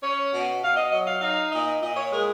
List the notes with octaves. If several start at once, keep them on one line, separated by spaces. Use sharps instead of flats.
C#4 C#5
B2
B2 F5
D#5
F#3 D#5
F5
D#4 F5
A#2 D#5
A#2 D#5
C#5
G#3 A#4